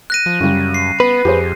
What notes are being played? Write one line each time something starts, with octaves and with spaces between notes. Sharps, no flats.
F#6 A#6 D#7
F3
F#2 C#3 G3
C7
B3 B4
F2 G4 G#4 C5